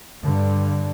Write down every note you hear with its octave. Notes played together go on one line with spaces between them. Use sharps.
G2 D3